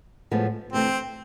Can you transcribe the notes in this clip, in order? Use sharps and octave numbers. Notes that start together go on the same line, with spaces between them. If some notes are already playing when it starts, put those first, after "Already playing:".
A2 F3 G#3 B3
D2 C3 E3 A3 C4